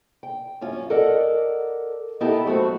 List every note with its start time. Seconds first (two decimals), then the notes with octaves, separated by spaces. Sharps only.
0.23 G5
0.61 F#2 C#4 F4
0.90 A4 A#4 D5 D#5 F#5
2.20 B3 D#4 E4 G4 A4 A#4
2.46 F#3 A3 C4 F#4